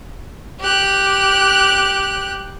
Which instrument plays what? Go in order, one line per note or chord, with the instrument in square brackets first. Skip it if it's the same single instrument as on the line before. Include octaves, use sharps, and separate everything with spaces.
[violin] G4 F#6